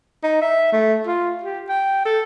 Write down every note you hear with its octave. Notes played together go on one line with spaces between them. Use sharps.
D#4
E5
A3
F4
G4
G5
A4